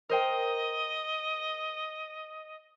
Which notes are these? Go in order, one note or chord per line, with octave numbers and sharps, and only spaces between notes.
A#4 C5 D#5 G5